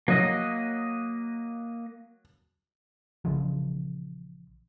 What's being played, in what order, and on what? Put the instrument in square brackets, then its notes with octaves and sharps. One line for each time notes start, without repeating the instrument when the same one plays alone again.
[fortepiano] F#3 [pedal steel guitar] A#3 D#5 D#6
[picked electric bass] A#1 C#3 E3 F3